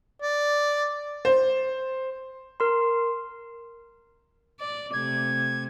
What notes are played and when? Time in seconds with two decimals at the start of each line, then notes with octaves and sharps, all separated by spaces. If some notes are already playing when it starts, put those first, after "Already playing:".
0.22 D5
1.25 C5
2.60 A#4 C6
4.60 D5
4.93 C3 A3 G#6